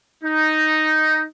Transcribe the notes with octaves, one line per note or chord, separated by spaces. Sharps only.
D#4